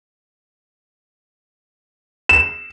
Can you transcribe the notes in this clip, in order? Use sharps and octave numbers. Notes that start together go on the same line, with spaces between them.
E7